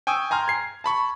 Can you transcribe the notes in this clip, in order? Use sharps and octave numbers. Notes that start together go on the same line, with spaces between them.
G5 G#5 C#6 D#6 E6
G5 G#5 A#5 C6 F6
G#6 C7
A5 B5 C#6